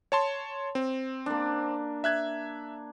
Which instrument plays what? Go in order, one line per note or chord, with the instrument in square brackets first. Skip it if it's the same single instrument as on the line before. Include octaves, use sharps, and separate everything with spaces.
[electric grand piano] C#5 A5 C6
C4
[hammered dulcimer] A#3 D4
[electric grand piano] E5 F#6 G#6